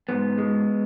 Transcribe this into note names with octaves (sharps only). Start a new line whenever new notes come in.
G#2 B3
G#3